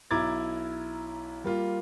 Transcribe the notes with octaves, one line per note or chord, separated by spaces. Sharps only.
B1 E4 A#5 D6 G#6 A6
G3 A#3 F4